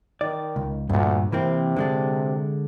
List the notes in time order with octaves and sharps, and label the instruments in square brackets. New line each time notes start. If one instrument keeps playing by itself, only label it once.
[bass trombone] D#3 [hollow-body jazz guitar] D5
[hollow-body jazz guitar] C#2
[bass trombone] D2 [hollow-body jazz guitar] G2 A#2
[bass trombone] C3 [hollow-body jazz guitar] E3 A#3 C4
[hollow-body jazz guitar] D3 G#3 D4